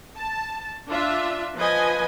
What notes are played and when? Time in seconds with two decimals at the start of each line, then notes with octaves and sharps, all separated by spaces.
0.17 A5
0.89 D4 F4 E5
1.56 F3 B4 D#5 G#5